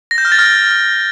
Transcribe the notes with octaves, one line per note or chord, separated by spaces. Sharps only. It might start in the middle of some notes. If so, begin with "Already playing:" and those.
A#6
G6
F6
A6
F6